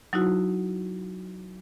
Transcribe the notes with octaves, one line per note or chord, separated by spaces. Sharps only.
F#3 D#4 E4 F#4